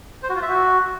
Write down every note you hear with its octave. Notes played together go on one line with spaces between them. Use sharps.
C5
F#4
F4
E5
F#4